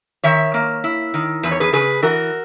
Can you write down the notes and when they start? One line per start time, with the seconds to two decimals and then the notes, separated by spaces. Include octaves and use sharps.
0.24 D#3 C#5 E5
0.54 A#3
0.84 E4
1.14 D#3
1.43 E2 B4
1.51 C#5
1.60 G#4 B4
1.73 C#3 G#4 B4
2.02 E3 F#4 A#4